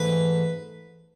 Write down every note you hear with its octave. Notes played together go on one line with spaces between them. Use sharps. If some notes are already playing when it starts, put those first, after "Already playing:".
Already playing: G#2 E3 A3 B4